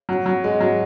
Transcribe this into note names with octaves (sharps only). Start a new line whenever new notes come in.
F#3
F#3
G#3
F#3